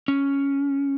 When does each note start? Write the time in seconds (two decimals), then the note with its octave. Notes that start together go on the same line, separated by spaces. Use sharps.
0.08 C#4